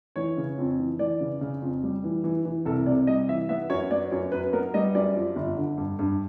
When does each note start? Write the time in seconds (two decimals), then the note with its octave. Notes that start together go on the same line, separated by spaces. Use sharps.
0.16 E3 C#5
0.37 C#3
0.58 F2
0.78 E3
0.99 E3 D5
1.20 C#3
1.41 C#3
1.62 F2
1.83 G3
2.04 E3
2.24 E3
2.45 E3
2.65 C2 A4
2.86 C3 D5
3.07 G3 D#5
3.29 E3 E5
3.49 B3 E5
3.70 F#2 C#5
3.91 B3 D5
4.11 F#2 C#5
4.32 F#2 B4
4.53 B3 A#4
4.74 G3 D#5
4.95 F#2 D5
5.16 F3
5.36 G1
5.57 D3
5.78 G2
5.99 G2